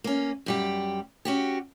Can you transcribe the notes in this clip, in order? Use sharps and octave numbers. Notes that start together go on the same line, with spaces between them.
A#3 C#4
F#2 G3 G4
C#4 F#4 G4